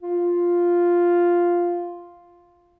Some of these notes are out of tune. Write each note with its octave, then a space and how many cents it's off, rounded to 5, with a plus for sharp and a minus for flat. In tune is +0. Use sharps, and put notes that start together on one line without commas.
F4 +0